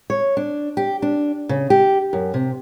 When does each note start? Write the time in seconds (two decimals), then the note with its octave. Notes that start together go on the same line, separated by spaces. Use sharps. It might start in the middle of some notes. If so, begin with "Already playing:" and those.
0.10 C#5
0.37 D4
0.77 G4
1.02 D4
1.49 C#3
1.70 G4
2.13 F#2
2.34 C3